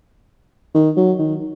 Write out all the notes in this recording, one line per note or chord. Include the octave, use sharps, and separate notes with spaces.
D#3
F#3
D#3